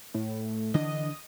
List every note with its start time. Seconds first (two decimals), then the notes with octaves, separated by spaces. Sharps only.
0.14 A2
0.74 D3 E3 D4 D#5